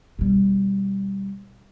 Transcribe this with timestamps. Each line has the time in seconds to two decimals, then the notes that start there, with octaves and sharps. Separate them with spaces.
0.19 B2 G3